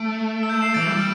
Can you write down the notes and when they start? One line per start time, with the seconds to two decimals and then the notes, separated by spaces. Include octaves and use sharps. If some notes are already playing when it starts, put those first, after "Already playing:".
Already playing: A3 D7
0.43 E6
0.49 G6
0.61 C7 E7
0.74 E3 A6 D7
0.87 G3